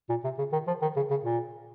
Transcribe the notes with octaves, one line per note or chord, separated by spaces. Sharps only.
A#2
C3
C#3
D#3
F3
D#3
C#3
C#3
A#2